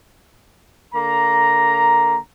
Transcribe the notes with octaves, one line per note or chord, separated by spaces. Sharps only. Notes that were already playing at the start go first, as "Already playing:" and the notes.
D3 A#3 A#5